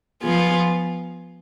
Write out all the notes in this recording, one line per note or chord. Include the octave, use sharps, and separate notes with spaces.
F3 B3 F4 G#4